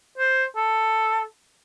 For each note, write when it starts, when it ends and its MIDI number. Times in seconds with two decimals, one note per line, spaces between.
0.18 0.44 72
0.56 1.21 69